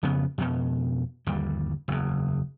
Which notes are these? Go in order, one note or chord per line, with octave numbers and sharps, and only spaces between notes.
F2 C#3 B3
F2 B2
G1 D#2 G3
F#1 E2